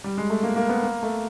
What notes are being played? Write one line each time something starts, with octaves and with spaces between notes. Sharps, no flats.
G3
G#3
A3
A#3
A#3
B3
A#3
A3